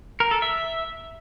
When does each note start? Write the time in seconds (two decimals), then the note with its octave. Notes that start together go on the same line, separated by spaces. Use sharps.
0.20 A#4
0.31 A4
0.42 E5